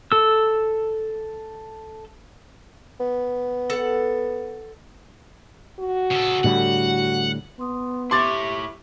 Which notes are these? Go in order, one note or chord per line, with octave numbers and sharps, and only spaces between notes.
A4 E6
B3
A4 F#5
F#4
C#3 A4
A2 D3 G3 F#5
B3 C6 D#6
E4 G4 C#5 E5 C6 D6 A6